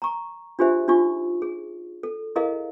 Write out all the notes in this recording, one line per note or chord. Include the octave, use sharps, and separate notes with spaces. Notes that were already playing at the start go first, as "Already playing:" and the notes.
A#5 C#6
D4 F4 G4 G#4 C5 E5
D4 D#4 F4 C#6
G#4
A4
E4 G#4 A#4 D#5 F5